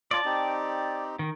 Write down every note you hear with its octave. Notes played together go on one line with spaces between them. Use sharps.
F4 C#5 D5 A5
C4 D#4 G4
D#3